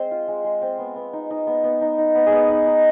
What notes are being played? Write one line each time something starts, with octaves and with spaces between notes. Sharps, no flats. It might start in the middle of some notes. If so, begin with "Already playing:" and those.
Already playing: G#3 C4 C5
F4
G#3
G#3
C4
B3
B3
D#4
D#4
B3
B3
D#4
D#4
B3
G#4
B3 B4
D#4
D#4